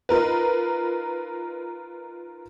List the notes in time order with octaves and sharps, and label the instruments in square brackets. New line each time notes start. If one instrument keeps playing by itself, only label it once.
[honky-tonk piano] D#4 F4 A#4 B4